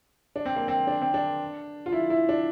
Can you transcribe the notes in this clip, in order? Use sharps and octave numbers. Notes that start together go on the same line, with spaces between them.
D4
C4
A#3
C4
D4
C4
D4
F4
E4
E4
D4